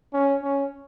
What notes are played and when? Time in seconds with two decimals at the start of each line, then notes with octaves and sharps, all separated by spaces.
0.13 C#4
0.44 C#4